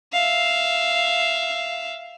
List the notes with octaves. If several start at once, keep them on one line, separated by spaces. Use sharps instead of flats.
E5 F5